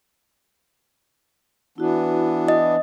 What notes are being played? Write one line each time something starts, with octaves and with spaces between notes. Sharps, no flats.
E3 B3 D4 E4 F#4
D#5